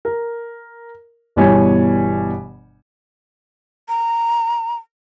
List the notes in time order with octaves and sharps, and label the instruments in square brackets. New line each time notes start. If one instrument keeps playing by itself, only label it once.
[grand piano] A#4
G1 B2 E3 G3 C#5 G#5
[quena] A#5